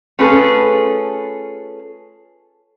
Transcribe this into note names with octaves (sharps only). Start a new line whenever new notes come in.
A3 C#4 F4 G#4 A4 B4